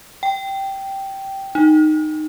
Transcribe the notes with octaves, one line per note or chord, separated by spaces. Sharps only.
G5
D#4